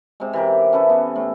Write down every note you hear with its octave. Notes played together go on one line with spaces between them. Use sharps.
C3 G#3
E3 G4 A#4
C#4 E4 A4 B4
B3
A2